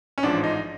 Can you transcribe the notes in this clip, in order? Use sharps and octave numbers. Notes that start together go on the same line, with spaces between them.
C#4
A1 G#2 F3 D4
D#4